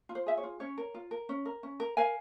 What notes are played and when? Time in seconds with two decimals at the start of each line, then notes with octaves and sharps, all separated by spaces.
0.09 F4
0.15 C5
0.26 G#4 E5
0.37 C#5
0.43 F4
0.60 C#4 C#5
0.78 A#4
0.94 F4
1.11 A#4
1.29 C#4
1.45 A#4
1.63 C#4
1.80 A#4
1.97 A#4 F5 G#5